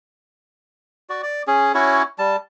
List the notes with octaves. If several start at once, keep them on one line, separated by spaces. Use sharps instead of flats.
F#4 D5
D5
C#4 G#4
C#4 E4 F#4 C#5
G3 A5